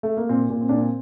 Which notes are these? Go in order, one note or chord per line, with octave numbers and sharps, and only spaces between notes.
A3
A#3
A#2 C4
A#2
C4
A#2 D4
C4